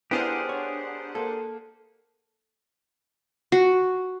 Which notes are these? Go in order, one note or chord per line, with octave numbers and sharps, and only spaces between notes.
B3 D4 E4 G4 G#4 A#4 C5 F#5
C#5
A#3 A4
F#4